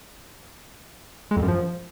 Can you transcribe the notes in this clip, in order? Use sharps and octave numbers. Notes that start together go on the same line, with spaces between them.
G#3
F2
F#2
F3